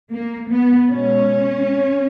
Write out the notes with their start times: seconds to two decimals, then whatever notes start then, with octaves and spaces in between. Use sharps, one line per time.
0.12 A#3
0.50 B3
0.87 B2 G#3 C#4